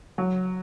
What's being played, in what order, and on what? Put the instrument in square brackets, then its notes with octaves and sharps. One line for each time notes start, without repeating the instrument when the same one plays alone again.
[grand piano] F#3